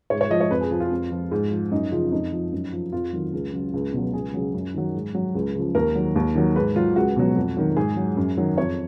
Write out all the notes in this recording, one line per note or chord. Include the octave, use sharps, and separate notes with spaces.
G#2 C#5
C#5
F3 D#5
C#5
F2 B4
G#4
F3
F4
F2
F3
G#2
F3
F#2 D#4
C#3 F3 F4
F2 D#4
F3
F#2
F3
F2 F4
D#3 F#3
C#2
C#3 F#3
C#2
B2 F#3
C#2 G#4
C#3 F#3
F#2
D#3 F#3
G#2
F#3
C#2
C#3 F3
D#2 A#4
D#3 F#3
D#2
D#3 F#3
G#2 B4
F#3 F4
C#2 F#4
B2 F#3
F2
D#3 F#3
G#2 G#4
F#3
F#2
D#3 F#3
F2 C#5